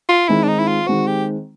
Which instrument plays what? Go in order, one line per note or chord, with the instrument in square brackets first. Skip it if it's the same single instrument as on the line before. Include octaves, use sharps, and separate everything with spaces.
[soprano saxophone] F4
[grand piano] D#3 G#3 C4 [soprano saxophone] E4
[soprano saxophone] D4
D#4
E4
F4
[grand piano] D#3 G#3 C4 [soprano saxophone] F#4
[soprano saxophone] G4